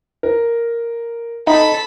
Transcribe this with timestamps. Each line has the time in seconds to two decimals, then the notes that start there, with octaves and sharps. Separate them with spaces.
0.23 A#4
1.47 D#4 A4 B5